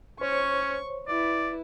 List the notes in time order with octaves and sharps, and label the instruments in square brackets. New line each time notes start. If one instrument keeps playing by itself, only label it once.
[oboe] C#4 [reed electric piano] C5 C#5 [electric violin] C#6
[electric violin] E4 B4 [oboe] D5